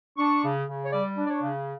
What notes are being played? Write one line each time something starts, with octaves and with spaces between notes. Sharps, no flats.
D4 C#6
C#3
C#3
C#5
G3 D5
D4
D5
C#5
C#3